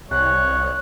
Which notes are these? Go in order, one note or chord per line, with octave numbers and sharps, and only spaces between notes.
C2 C#5 F#6